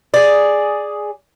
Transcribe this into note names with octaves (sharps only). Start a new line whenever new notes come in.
G#4 D5